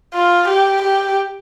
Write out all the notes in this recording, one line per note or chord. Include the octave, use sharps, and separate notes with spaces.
F4
G4
G4